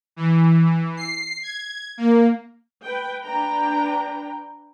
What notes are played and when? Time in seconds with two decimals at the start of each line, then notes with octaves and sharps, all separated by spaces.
0.16 E3
0.66 E3
0.97 C7
1.43 G#6
1.98 A#3
2.82 B4 G5
3.24 D4 B4 G5 A#5